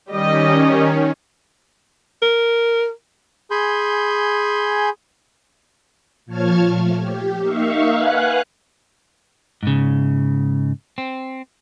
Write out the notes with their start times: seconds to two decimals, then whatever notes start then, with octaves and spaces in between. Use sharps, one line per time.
0.10 D#3 G3 C#4 G4 D#5
2.22 A#4
3.51 G#4 G#5 B5 C6 G6
6.26 A#2 F3 C#5 A5 F6 G#6
6.68 F3 A3
6.98 G4
7.40 A#3 D#4 E5 F5 C#6
7.91 B4 F5 F#5 G#5 F#6
9.63 G#2 C#3
10.98 C4